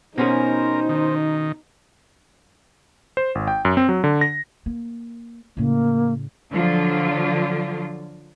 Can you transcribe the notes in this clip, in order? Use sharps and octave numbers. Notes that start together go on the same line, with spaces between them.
B2 C#4 D#4 G#4 A#4 C5
D#3
C5
G#1
G5
F#2
C4
F#3
D3
A#6
A#3
A2 C#3 A#3
D3 F3 F#3 F4